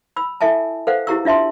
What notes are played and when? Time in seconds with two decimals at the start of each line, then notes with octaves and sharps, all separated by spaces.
0.16 B5 E6
0.41 E4 A4 E5 G#5 A5
0.87 A4 B4 C5 F5 F#5
1.07 E4 G4 G#4 A#5 C#6 E6
1.25 D4 F4 E5 A5 C6